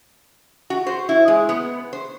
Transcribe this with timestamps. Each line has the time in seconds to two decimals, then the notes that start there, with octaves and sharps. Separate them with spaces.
0.70 F#4
0.87 C5
1.09 E4
1.28 G#3
1.49 B3
1.93 C5